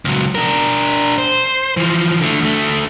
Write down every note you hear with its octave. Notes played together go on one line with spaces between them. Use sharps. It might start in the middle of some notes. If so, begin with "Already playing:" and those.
C#2 F#3
D4 A#4
C5
E3 F3
D3 A3
D2 A3